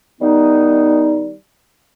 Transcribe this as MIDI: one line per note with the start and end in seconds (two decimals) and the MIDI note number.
0.21 1.33 51
0.21 1.33 55
0.21 1.33 59
0.21 1.33 63